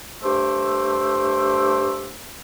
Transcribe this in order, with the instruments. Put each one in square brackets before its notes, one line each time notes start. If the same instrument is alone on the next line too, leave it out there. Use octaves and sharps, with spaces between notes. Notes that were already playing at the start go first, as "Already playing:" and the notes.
[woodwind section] G2 A3 C5 D6 E6